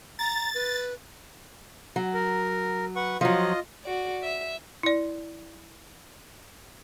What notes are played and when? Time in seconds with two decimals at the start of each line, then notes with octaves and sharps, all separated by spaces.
0.19 A#5 A6
0.54 B4
1.96 F#3
2.14 A#4
2.96 B4 F#5 C#6
3.21 F3 F#3 F4 D#5
3.84 F#4 D5
4.23 E5
4.83 E4 D5